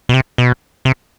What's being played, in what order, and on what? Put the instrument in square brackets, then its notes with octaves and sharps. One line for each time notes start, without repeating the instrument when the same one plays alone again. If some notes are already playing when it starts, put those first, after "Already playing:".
[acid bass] B2
C3
B2
C3